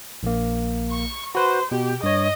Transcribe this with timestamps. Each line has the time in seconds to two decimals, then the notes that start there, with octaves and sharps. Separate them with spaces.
0.23 A#1 A#3
0.91 C#6
1.35 F#4 B4 C5
1.71 B2 G4
2.03 G2 C#5 D#5